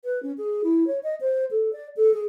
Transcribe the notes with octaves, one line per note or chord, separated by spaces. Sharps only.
B4
C#4
G#4
E4
C#5
D#5
C5
A4
D5
A4
G#4